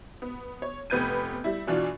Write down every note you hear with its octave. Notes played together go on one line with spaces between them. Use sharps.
B3
C#5
F1 B3 B4 G6 G#6 D#7
G3 E4
B2 E3 D4 F4 F#4